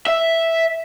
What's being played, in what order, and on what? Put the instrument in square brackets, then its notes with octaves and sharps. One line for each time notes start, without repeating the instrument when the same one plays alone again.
[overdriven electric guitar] E5